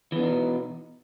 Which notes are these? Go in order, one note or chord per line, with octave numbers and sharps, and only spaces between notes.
B2 E3 B3 D4 D#4